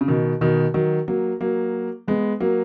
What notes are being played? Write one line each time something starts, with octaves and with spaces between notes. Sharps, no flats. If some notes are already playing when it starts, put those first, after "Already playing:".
C#3
B2 D#3
B2 D#3
D#3 F#3
F#3 A#3
F#3 A#3
G#3 B3
F#3 A#3